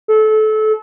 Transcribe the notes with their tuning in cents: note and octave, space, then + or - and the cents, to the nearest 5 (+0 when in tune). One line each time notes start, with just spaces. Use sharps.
A4 -25